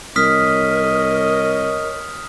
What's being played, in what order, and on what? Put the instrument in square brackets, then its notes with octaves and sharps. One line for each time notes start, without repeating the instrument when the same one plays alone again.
[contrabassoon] C2 [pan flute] A#4 [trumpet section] C#5 D#5 [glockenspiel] D#6 F6 B6